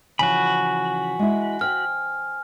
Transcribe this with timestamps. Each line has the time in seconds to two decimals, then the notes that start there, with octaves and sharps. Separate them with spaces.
0.19 C#3 E3 F3 F#4 G#5 B5
1.19 G#3 E4
1.61 C5 G5 F6